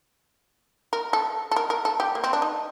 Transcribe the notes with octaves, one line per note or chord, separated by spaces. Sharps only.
A#4
A4
A4
A#4
A#4
A4
G4
A#3
C4
D4
D#4